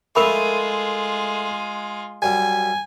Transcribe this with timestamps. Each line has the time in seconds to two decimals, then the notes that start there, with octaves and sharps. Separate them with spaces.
0.15 G#3 A3 F4 A#4 B5 C#6
2.22 F#2 G3 G#5